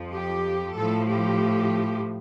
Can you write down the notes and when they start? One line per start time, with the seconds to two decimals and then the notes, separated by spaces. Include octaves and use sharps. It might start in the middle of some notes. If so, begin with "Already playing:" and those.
Already playing: F2 F3
0.11 G4
0.75 A2 F3 A4
1.08 G4